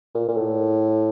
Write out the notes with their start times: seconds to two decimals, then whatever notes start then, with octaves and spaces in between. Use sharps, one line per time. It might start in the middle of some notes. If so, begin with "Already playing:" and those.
0.15 A#2
0.28 A#2
0.37 A2